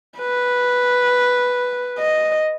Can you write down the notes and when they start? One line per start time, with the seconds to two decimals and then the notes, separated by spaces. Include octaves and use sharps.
0.19 B4
1.99 D#5